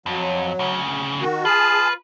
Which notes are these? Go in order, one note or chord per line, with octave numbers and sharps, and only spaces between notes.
F2 F#3
D2 C#3
D#3 F#4
F4 G#4 B4 A5